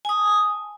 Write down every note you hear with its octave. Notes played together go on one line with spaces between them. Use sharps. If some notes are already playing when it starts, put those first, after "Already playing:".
G#5 A5 D#6